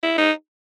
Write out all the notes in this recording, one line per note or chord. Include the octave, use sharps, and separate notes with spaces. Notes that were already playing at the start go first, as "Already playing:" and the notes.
E4
D#4